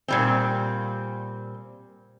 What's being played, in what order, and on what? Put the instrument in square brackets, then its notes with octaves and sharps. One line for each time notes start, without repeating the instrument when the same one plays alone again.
[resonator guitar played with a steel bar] A#2 G3 C4